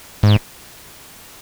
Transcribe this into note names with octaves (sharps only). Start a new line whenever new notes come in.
G#2